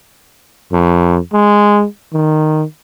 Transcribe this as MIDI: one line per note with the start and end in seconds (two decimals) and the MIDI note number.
0.72 1.18 41
1.33 1.85 56
2.13 2.64 51